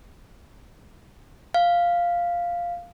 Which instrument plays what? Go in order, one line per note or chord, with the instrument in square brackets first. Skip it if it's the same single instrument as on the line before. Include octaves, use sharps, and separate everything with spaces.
[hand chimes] F5